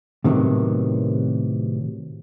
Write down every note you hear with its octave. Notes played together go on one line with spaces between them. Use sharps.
A2 C3 D#3 F#3 B3